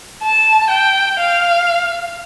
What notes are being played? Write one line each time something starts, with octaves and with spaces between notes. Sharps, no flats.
A5
G5
F5